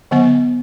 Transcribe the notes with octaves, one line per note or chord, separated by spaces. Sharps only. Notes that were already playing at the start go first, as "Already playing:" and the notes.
D3 F#3 B3 F#5